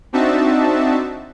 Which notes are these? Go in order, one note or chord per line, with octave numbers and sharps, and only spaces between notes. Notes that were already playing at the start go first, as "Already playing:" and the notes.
C4 D4 D#4 F#4 E5 A5